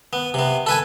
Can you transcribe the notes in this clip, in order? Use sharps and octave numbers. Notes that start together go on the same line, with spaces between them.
B3
C3 B3
A4 B4 G#5